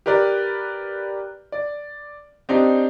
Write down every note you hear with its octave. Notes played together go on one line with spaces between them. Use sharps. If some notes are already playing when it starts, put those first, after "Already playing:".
G4 A#4 B4 D5
D5
C4 D4 D#4 G4